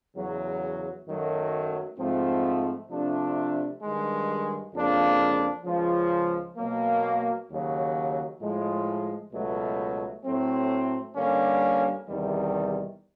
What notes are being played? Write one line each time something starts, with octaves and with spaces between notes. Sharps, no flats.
E2 C#3 F#3
F#2 D#3 F#3 A3
G#2 F3 A3 C4
C3 F3 A3 D4
G2 D#3 G#3
F2 C#3 F3 A#3 D4
C#2 C#3 F3
B2 F#3 A#3
D#2 C#3 F#3
A2 F3 G#3
C#2 B2 F#3 A3
A2 F#3 A3 C4
G2 D3 G3 A#3 C#4
E2 C3 D#3 G3